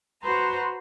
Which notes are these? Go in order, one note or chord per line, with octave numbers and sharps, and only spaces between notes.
F#4 B4 C5 A#5 C6